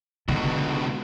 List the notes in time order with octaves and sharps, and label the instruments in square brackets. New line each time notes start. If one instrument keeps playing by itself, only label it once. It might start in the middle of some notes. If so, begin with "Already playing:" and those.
[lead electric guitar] C#2 B2 [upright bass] D3